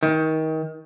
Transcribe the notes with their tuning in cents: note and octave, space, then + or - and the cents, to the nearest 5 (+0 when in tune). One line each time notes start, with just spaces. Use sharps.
D#3 +25